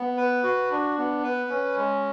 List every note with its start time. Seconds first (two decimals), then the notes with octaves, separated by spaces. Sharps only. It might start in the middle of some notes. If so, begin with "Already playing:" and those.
Already playing: B3
0.17 B4
0.43 F#4
0.70 D4
0.98 B3
1.23 B4
1.50 C#4
1.76 G#3